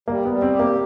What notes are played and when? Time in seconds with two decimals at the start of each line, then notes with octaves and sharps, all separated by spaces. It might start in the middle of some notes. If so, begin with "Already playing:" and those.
0.08 G3 A#3
0.25 B3
0.31 G3
0.42 C4
0.54 G4
0.59 A#3